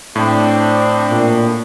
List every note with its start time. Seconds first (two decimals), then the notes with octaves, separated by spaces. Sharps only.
0.16 A2 C4 D4
1.10 A#2